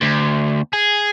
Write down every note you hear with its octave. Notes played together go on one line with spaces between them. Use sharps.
D2
G#4